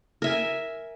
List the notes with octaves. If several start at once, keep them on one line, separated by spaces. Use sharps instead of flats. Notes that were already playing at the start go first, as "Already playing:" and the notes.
A#4 E5 G#5